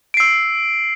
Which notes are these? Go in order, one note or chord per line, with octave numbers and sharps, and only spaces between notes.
E6 C7 D7